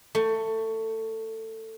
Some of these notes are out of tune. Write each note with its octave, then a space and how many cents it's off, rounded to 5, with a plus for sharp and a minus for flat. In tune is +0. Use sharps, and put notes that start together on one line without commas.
A3 +20